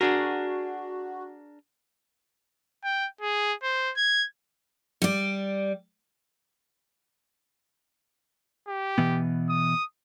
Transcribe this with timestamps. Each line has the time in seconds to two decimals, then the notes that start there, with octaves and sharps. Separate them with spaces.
0.01 D4 F#4 G#4 A#4
2.84 G5
3.21 G#4
3.63 C5
3.97 G#6
5.02 G3 D5
8.67 G4
8.98 B2 E3 B3
9.49 D#6